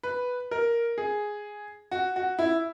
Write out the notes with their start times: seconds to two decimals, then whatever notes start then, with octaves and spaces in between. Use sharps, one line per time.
0.03 B4
0.51 A#4
0.98 G#4
1.92 F#4
2.16 F#4
2.39 E4